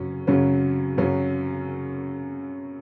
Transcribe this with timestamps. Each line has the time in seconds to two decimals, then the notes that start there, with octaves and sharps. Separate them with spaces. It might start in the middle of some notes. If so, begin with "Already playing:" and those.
Already playing: F#2 C#3 F#3 C#4
0.27 F#2 C#3 F#3 C#4
0.98 F#2 C#3 F#3 C#4